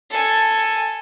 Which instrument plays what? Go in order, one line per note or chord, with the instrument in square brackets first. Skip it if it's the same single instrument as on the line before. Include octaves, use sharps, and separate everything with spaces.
[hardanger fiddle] A4 G#5